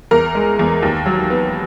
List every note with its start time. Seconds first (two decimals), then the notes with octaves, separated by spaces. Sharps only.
0.11 E2 A#4
0.35 G#3
0.59 E2
0.83 D#2
1.06 F#3
1.30 B3